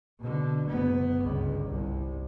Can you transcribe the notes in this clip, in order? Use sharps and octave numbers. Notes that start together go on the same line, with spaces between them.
B2 D3
F#1 B3
G1 C#2
C2